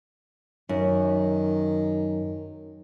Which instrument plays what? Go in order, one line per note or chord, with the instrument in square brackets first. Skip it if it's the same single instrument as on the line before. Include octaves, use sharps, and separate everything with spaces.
[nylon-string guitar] F#2 [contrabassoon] D#3